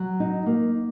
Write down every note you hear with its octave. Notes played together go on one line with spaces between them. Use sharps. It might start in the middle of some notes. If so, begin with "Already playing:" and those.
Already playing: F#3
D#4
A#3